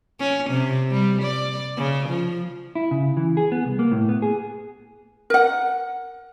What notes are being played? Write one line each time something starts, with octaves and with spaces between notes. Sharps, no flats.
C#4
C3
G3
D5
C#3
F3
E4
C#3
E3
G#4
B3
C2
A#3
A2
B3
G#4
A#4 F#5